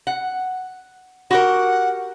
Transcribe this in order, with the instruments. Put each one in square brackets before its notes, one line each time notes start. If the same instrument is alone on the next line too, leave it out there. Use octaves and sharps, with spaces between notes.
[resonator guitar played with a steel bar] F#5
[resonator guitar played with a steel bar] F#4 G4 A#4 [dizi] F#5